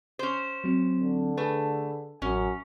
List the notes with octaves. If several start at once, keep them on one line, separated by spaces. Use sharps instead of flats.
C#4 C5
F#3 C4
D3
A3 G#4 B4
A1 F#2 C#4